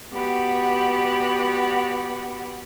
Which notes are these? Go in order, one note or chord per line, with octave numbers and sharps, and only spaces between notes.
B3 F#4 G4 D5 F#5 B5